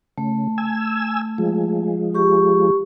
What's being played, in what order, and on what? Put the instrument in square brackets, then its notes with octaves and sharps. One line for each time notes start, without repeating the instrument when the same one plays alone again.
[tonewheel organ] C#3 [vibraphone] A3
[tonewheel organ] G#5 E6
F3 G#3
[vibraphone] G4 C#6